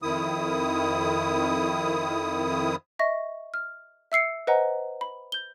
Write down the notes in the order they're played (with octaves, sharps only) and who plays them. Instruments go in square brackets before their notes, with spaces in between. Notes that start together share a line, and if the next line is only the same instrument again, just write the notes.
[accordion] F2 D#3 E4 D#6
[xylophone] D#5 E5 C#6 A#6
F6
E5 E6 C7 C#7
B4 C5 D#5 F#5 G#5 A#5
B5
G6 G7